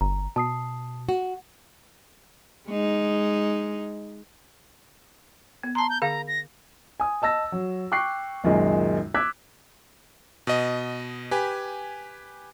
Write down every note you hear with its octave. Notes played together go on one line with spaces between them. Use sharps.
G1 A#5
B2 A5 D#6 C7
F#4
G#3 D#4
B3
A5 A#5 C6
G6
D3 G#4 F5 A#5
A#6
G#5 D#6
D#5 A5 E6 A#6
F#3
G5 C#6 D6 F#6 C7
C#2 F#2 A#2 D#3 G#3
D6 E6 F#6 G#6 B6
B2 D#5
G4 B4 G#5